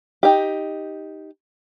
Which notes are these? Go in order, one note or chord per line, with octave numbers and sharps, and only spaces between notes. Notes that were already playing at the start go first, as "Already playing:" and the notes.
D#4 G4